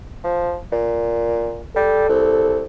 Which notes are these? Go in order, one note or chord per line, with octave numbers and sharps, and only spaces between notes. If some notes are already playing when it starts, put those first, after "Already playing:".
F3
A#2
G3 A4
C2